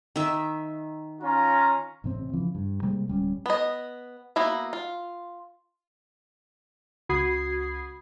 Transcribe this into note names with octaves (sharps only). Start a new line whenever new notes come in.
D#3 E5
C#4 F4 A#5
A1 C3 A#3 C4
C#3 E3 F3
G2
C3 G3 G#3 A#3
D1 G3 B3 C#4
B3 D#5
A#3 B3 E4 F#4
F4
C#2 F#4 B5 D#6 G#6 C7